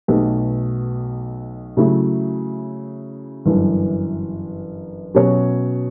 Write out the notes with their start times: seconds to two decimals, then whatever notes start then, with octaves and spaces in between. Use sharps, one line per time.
0.08 B1 B2 A3
1.77 C#3 F#3 A3 E4
3.46 G1 F#2 E3
5.14 B2 F#3 C#4 F#4 C#5